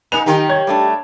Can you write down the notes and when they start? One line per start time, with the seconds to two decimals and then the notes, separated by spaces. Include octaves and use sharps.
0.12 A#3 D#4 G#5 F7
0.26 F#2 D#3 A#3 D#4 G4
0.49 C#5 G#6
0.67 G3 A3 D4